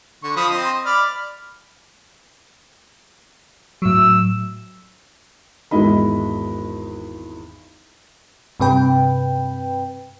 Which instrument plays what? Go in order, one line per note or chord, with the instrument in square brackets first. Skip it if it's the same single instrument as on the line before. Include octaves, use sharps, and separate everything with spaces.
[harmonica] D3 C#6
F3 B5 D#6
C4 C5 D#5
D5 B5 F6
[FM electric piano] A2 F#3 [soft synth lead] E6
[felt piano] G#1 E2 G#3 E4 D#5 B5
[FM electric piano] G2 C3 B4 G5